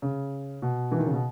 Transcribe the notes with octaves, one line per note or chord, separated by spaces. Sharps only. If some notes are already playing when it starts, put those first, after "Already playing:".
C#3
B2
E3
D#3
C#3
B2